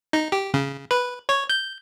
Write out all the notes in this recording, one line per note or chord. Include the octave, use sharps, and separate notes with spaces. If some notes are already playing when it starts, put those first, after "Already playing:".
D#4
G4
C#3
B4
C#5
G6